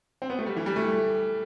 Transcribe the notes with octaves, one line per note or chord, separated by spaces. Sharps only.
C4
B3
A3
G3
E3
G3
A3